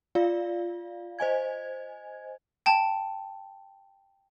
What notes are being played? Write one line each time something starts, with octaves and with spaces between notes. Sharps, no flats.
F4 D5 F5
C5 D#5 G#5 G#6
G5 A5